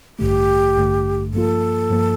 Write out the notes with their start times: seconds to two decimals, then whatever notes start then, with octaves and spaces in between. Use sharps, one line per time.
0.19 A1 G2 D3 A3 G4
0.76 A1 G2 D3 A3
1.33 G2 F3 A#3 F4 A4
1.90 G2 F3 A#3 F4